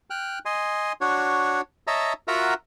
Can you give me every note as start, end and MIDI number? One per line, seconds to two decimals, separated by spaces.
0.10 0.39 79
0.10 0.39 89
0.10 0.39 90
0.45 0.92 75
0.45 0.92 80
0.45 0.92 84
1.01 1.61 62
1.01 1.61 66
1.01 1.61 73
1.87 2.13 73
1.87 2.13 75
1.87 2.13 76
1.87 2.13 81
1.87 2.13 82
2.28 2.54 65
2.28 2.54 66
2.28 2.54 70
2.28 2.54 76
2.28 2.54 78
2.28 2.54 82